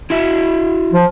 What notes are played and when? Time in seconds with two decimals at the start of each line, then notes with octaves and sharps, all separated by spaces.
0.10 E4 F#4 E5
0.93 F3